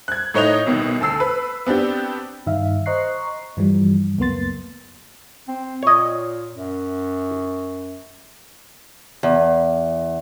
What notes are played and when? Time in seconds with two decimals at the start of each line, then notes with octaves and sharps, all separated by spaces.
0.08 F#6 G#6
0.34 A2 D#4 C#5 D#5 F7
0.66 C2 B2 D#3
1.01 D2 A5 E6 C7
1.20 B4
1.66 B3 C4 D4 G4
2.46 G2 D#3 D#4 E5 F5
2.86 C5 D#5 A#5 C#6 F#6 C7
3.57 G2 E3 F3 G3
4.18 C#2 F#2 A#3 B3 C6 A6
5.48 C4
5.83 A#2 C#5 D#5
6.54 F#2
9.23 E2